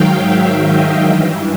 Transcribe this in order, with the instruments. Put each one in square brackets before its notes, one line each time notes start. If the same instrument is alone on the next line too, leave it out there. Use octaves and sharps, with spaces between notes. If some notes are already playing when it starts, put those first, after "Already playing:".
Already playing: [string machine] G#2 D#3 F#3 F5 G5
E5
D#5
G2 E3